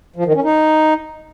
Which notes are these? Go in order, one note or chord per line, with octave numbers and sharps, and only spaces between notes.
F3
D#3
C#4
D#4